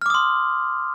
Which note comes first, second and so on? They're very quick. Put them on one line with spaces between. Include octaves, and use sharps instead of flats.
F6 D6 D#6 C6